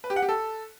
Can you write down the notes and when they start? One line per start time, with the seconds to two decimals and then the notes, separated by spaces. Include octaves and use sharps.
0.04 B4
0.10 G4
0.16 F#5
0.22 G4
0.29 A4